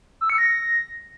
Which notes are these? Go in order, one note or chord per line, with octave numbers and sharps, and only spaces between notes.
E6
C#7
A#6